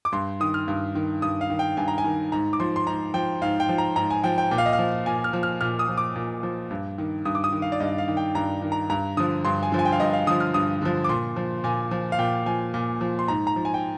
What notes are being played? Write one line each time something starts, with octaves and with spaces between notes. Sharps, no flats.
D6
G2 C6
D#3 D#6
F6
G2
D#3
G2 D#6
F5
D#3
G5
G2 G#5
A#5
G#5
D#3
G#2 A#5
D6
F3 C6
C6
G#2 A#5
F3 G5
G#2 F5
G5
F3
A#5
G#2 A#5
G#5
F3 G5
G5
A#2 G5
F5
D#5
F5
F3
A#2 G#5
F6
F3
F6
A#2 F6
D#6
F3
D6
A#2
F3
G2
D#3
G2 D#6
D6
D#6
D#3
F5
D5
G2 D#5
F5
D#3
G5
G2 A#5
D#3
A#5
G2 A#5
D3 F3 D#6
G2 C6
G#5
D3 F3
G#5
G5
F5
G2 D#5
F5
D3 F3 D#6
F6
G2 D#6
D3 F3
D6
A#2 C6
F3
A#2 G#5
F3
F5
A#2 G5
F3 G#5
A#2
F3
C6
G#2 A#5
A#5
F3
G#5
G5